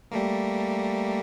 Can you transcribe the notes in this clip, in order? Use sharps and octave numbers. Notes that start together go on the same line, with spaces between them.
G3 A3 A#3